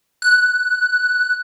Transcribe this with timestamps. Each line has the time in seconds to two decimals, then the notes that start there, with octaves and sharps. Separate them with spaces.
0.22 F#6